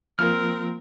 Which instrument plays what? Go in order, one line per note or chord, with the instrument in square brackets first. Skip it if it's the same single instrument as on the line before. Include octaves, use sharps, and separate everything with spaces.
[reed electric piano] F3 A#3 F4 [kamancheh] C4 A#4 [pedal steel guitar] F6